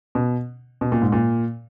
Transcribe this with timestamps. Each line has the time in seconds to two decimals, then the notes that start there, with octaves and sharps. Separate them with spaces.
0.15 B2
0.81 B2
0.92 A#2
1.02 G#2
1.12 A#2